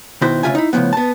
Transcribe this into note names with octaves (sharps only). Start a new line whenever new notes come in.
B2 D#3 E4 F#4 C5
D2 C#3 F4 E5 G#5
D#4 E4
A2 C#3 E3 F3 B3
B3 A5